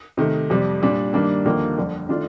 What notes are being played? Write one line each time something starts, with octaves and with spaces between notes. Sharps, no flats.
C3 D#3 A3
F2 C3 G3
A#2 G3 D4
G2 D#3 G3 A#3 D4
D#2 D3 F3 A#3 D#4
G1 F2 D3
D#3 A3 D4 F4